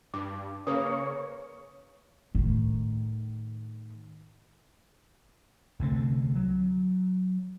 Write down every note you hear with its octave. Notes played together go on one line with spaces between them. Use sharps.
G2 D6
C#3 A#3 B4 C#5 D#6
A2 D#3
C2 D3 A3 C4
F#3